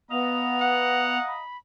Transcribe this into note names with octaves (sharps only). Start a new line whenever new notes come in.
B3 D#5 F5 A#5 F7
F#5
B5